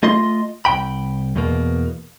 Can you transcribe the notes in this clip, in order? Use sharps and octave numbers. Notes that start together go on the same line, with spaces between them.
A3 F4 D#5 C6
C2 F#2 G5 B5
E2 B2 A#3